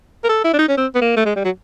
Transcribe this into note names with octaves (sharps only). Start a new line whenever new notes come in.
A#4
A4
E4
D4
D#4
C#4
C4
B3
A#3
A3
G#3
G3
F#3